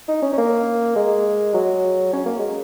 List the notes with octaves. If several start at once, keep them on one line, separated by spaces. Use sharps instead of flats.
D#4
C#4
C#4
A#3
G#3
F#3
C#4
A#3
G#3